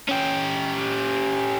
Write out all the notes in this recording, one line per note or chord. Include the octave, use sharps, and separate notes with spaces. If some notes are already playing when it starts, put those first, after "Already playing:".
C#4 G4